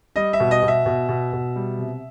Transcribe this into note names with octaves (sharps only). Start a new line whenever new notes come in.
G3 D#5
E5
B2
D#5
B2
E5
B2
B2
B2
G3
C3